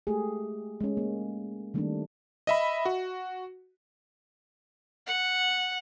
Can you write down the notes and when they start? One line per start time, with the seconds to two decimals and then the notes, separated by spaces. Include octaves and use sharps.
0.07 G#3 A3 G4 G#4
0.80 G#3 C#4
0.97 A#3
1.74 D#3 G3 A3 A#3 C4 D4
2.47 D#5 E5 B5
2.85 F#4
5.07 F#5